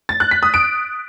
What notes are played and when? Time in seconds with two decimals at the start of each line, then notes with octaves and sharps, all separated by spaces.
0.09 A6
0.20 F#6
0.31 B6
0.43 D#6
0.54 D7